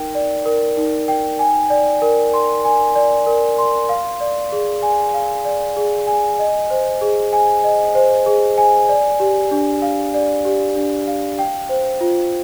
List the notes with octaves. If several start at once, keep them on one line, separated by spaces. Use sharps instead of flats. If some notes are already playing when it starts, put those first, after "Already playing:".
Already playing: D#4 A#4 G5
D5
A#4
D#4
G5
G#5
D5
A#4
C6
G#5
D5
A#4
C6
F5
D5
G#4
G#5
F5
D5
G#4
G#5
D#5
C5
G#4
G#5
D#5
C5
G#4
G#5
D5
G4
D4
F5
D5
G4
D4
F5
G5
C5
F4